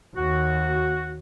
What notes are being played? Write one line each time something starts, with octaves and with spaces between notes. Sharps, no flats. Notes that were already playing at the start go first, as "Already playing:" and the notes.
D#2 F#4